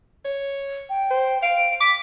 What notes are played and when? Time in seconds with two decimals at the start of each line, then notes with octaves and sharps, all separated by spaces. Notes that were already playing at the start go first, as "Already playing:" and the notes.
0.25 C#5
0.90 G5
1.10 C5
1.42 F5 D7
1.81 D6 B6